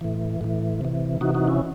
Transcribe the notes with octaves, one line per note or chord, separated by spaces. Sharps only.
A2 E3
A2 E3
C3 E3
C3 E3 D#4 F#4
D#4 F#4
C#4 E4